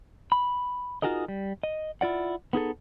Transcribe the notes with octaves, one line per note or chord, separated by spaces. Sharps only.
B5
D#4 F4 F#4 G#4 A#4 D#5
G3
D#5
E4 F4 D5 F#5
B3 D#4 G#4 A4